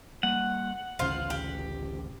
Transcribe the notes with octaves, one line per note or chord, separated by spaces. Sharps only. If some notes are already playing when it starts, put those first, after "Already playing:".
G3 A#3 F#5
A1 D2 C#3 F4 C5 F5
G4